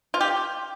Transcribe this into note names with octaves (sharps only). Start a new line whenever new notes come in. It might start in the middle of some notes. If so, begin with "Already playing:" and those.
F4
G4